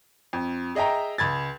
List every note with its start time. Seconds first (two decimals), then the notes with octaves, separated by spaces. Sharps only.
0.33 F2
0.75 G#4 D#5 E5 G5 A#5
1.18 C#2 B5 G#6 A6